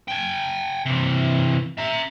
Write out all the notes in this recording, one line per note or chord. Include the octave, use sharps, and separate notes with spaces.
G5 G#5
C3 E3
E5 A#5